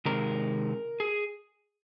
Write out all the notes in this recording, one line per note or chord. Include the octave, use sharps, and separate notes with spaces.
C3 D#3 G#3 C4 A#4
G#4